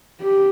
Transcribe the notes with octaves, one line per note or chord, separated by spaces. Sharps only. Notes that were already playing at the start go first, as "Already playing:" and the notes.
G4